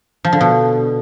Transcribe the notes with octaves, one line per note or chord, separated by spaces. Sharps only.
F3
D3
B2